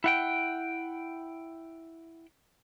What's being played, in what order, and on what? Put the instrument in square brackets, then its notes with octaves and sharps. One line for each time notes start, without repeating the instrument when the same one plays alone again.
[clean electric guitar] E4 F#5 G5